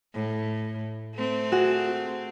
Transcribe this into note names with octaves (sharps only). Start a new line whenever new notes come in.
A2
A3 C4
F#4 G#4 E7